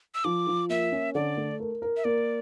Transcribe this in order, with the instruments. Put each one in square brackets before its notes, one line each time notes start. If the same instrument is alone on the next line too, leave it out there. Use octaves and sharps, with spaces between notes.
[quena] E6
[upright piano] F3 [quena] D6
[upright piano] F3
[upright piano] A#3 [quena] E5
[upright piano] C#4
[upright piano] D3 [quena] D5
[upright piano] A3
A#4
A#4
[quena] E5
[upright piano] A#3 [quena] D5